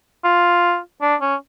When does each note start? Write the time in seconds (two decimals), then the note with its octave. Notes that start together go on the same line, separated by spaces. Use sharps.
0.24 F4
1.01 D4
1.21 C#4